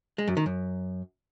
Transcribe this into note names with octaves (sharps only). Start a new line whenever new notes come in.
G#3
F#2
D#3
F#2